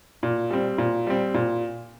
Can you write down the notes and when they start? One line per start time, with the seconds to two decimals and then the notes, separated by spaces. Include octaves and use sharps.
0.23 A#2
0.50 G3 C4
0.78 A#2
1.07 G3 C4
1.34 A#2